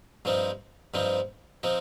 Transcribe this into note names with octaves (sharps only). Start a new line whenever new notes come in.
G2 F3 C4 D#4
G2 F3 C4 D#4
F3 C4 D#4